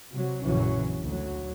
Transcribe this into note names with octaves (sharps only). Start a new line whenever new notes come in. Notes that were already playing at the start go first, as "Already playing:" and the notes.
C3 F#3
A#1 F#2 C#3 E3 F#3 C#4
D2 F#3